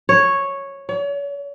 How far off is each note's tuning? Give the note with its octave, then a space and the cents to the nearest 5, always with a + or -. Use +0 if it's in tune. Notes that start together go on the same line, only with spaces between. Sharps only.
C#5 -5
C#5 +40